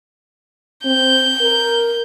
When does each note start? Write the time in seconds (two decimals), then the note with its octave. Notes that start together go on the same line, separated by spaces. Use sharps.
0.85 C4 G6
1.41 A#4